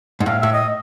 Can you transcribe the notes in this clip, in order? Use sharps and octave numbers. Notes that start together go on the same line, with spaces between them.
G#2
A2 F5
A2 E5
D#5